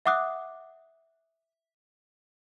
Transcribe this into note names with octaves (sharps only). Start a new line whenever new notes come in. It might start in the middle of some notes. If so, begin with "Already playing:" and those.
E5 F#5 D6 D#6 F#6